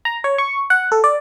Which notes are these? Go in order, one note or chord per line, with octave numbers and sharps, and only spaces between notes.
A#5
C#5
C#6
F#5
A4
D5